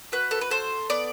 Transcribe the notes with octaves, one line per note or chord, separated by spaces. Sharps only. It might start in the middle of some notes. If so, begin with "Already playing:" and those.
F#4 B4
A4
B4
A4 C5
B3 D5